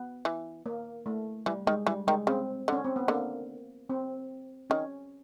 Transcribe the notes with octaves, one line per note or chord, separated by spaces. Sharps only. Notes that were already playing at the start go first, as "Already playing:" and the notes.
Already playing: B3
E3
A#3
A3
E3 G3
D#3 G#3
E3 G3
D#3 G#3
C#3 C4
D3 C#4
C4
B3
D3 A#3
C4
D#3 C#4